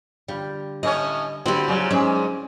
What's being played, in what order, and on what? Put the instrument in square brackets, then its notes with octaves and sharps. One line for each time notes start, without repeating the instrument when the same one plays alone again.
[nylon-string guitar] D3 F4 [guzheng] G3
[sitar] A2 C#4 C#5 [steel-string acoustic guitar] D#5
[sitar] D3 [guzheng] C4 E4 [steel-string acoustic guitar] F#4 G4
[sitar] A#2 C#3 [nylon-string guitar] F#3 G3
[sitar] G#2 [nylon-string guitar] F#3 G#4 [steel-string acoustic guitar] G#3 C#4 D5